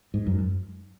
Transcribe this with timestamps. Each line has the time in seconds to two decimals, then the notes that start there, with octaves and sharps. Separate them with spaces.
0.14 G#2
0.27 F#2